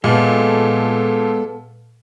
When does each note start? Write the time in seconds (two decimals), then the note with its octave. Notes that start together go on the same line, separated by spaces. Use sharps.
0.04 A#2 G#3 B3 A4